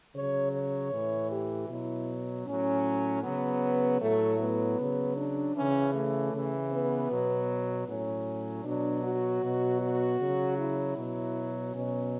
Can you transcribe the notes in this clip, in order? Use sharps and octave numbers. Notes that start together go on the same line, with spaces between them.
C#3 F#3 C#5
C#5
A2 E3
G4
B2 F#3 E4
A2 F#3 C#4
C#3 F#3 B3
A2 F#3 A3
B3
C#3 F#3
D4
C#3 E3 C#4
A3
C#3 E3
B3
B2 F#3
A2 F#3 C#4
B2 F#3 D4
F#4
B2 F#3
F#4
C#3 F#3
E4
B2 F#3
B2 F#3 C#4